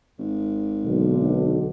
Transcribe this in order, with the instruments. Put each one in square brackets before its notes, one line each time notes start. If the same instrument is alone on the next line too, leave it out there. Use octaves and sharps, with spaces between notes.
[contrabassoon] G#1
[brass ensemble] B1 D3